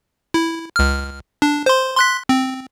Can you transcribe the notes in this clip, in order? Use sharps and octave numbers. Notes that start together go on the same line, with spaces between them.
E4
C#2 F6
D4
C5 C6
C6 F#6 B6
C4